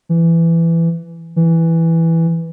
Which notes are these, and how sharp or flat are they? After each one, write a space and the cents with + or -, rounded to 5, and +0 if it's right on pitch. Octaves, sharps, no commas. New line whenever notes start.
E3 +15
E3 +0